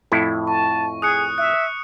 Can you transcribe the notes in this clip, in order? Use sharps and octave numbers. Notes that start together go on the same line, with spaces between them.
F2 A2 E4
A5 C#6
G#4 D#6 F#6 C#7
E5 F#6